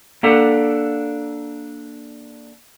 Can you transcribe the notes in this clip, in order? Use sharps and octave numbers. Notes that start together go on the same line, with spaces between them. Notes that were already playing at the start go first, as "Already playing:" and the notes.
A#3 D4 G4 A4 F#5